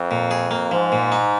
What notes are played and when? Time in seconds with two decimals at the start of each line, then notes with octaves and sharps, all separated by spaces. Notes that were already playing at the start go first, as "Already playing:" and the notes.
Already playing: F2
0.11 A#2
0.31 G#4
0.51 A#3
0.71 G#2 F3
0.92 A#2
1.12 D#4